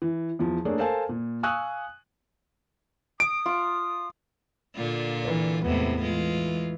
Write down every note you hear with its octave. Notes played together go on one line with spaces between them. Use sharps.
E3
E2 F3
A3 A#3 D4 G#4 A#4 C#5
A4 A#4 C5 F5 G#5 A5
A#2
F5 G#5 C#6 D#6 E6 F#6
D#6 D7
F4
A#2 D3 F4
E3
E2 A2 C3 G#3 B3
E3 G#3 F4